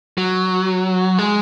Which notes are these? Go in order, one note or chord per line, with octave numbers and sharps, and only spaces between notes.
F#3
G#3